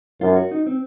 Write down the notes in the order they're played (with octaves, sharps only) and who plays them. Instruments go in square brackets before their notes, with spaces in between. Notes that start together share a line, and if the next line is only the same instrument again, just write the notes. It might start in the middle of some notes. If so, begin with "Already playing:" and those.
[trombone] F#2 [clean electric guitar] F4
[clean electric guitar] F#4
D#4
C4